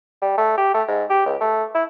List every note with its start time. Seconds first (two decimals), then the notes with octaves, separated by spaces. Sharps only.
0.22 G3
0.38 A3
0.58 G4
0.74 A3
0.88 G#2
1.10 G4
1.26 C#2
1.41 A3
1.75 E4